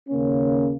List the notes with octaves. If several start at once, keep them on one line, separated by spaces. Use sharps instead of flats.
D#2 C#3 A#3 C#4